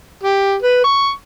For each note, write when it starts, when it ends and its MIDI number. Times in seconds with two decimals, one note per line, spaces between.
0.23 0.55 67
0.62 0.83 71
0.84 1.10 85